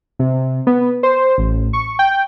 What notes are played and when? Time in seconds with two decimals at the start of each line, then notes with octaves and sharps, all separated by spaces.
0.19 C3
0.67 B3
1.03 C5
1.38 A1
1.73 C#6
1.99 G5